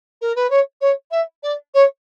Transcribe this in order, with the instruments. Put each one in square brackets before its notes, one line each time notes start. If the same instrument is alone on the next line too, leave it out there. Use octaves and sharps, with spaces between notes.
[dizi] A#4
B4
C#5
C#5
E5
D5
C#5